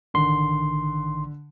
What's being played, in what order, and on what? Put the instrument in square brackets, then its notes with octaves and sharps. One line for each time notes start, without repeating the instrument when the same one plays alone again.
[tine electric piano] A1 D#3 C6 [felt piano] D3